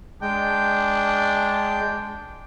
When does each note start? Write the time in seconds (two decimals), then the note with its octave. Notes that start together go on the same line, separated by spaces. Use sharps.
0.22 G#3 D4 G5